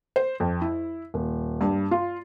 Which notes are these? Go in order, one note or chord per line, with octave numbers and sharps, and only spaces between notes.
C5
F2
E4
D#1
G2
F4